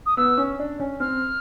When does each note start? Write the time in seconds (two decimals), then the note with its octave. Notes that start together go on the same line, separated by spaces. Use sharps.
0.06 D#6
0.17 B3 E6
0.37 C#4
0.59 D4
0.80 C#4
1.00 C4 F6